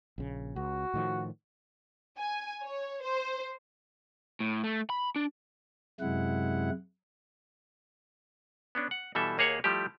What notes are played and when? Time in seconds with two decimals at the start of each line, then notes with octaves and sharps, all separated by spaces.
0.18 A#1 C#3
0.56 C#2 F#4
0.94 A2 D#3 F3
2.19 G#5
2.64 C#5
3.03 C5
4.40 A2
4.64 A3
4.90 B5
5.16 D4
6.00 F#2 C3 G#3 E4 F#5
8.75 B3 C#4 D4
8.91 F#5
9.15 B2 E3 G3 A4 E5
9.38 D#2 A#3 G#4 C#5 F#5 G#5
9.64 F3 G3 A3 E4 G4